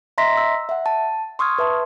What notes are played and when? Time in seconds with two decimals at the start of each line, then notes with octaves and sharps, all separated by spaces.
0.18 D#5 E5 A#5 C6 A#6 B6
0.37 E6
0.69 E5 F#5
0.86 A5
1.39 C6 C#6 D#6 F6 G#6
1.58 B4 E5 A5 C6